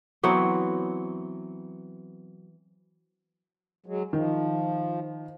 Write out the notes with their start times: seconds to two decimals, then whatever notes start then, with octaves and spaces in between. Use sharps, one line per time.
0.23 E3 F#3 B3 C4
3.86 F#3 G#3
4.13 D#3 F3